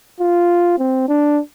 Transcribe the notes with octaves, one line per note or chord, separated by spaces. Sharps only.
F4
C4
D4